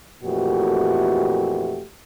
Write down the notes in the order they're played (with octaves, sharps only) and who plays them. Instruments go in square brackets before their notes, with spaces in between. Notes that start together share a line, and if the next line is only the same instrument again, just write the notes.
[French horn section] F2 A#2 E3 A3 F#4 G4